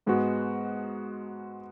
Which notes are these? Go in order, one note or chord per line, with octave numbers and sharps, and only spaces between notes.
G#2 G#3 B3 F#4